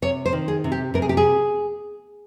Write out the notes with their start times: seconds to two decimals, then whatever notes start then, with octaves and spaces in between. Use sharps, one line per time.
0.02 C3 C#5
0.26 C5
0.33 D#3
0.48 G#4
0.64 C3
0.72 G4
0.94 C3 A#4
1.02 G#4
1.09 G4
1.17 G#4